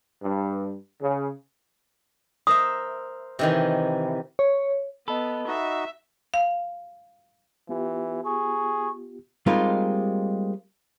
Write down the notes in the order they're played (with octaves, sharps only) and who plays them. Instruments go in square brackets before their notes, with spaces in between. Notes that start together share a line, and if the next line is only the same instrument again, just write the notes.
[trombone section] G2
C#3
[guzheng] A#4 C5 E5 [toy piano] D#6
[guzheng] C3 D#3 E3
[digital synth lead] C#5
[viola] B3 [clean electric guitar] A4 [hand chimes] D#5 B5
[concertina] D#4 F#4 [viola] E5
[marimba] F5
[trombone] E3 [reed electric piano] B3 F4 G4
[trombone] G#4 [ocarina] C#6
[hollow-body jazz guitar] G3 G#3 A#3 C4 D#4 F4